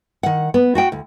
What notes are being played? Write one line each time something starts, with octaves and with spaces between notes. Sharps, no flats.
D#3 F#5
B3
F#4 F#5 G5
D2